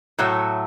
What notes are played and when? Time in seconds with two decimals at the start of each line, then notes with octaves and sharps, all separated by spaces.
0.19 A2 F#3 A3